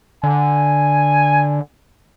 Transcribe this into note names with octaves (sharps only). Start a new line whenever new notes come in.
D3 G#5